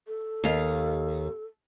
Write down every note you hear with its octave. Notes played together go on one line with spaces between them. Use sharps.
A4
D#2 F5